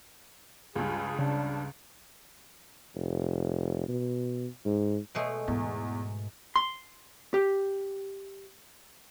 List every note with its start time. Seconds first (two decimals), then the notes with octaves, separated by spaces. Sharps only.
0.76 C#2 G2 G#4
1.19 C#3 D4
2.95 F1
3.89 B2
4.65 G#2
5.15 B2 G#3 A3
5.48 E2 G#2
6.56 C6
7.34 G4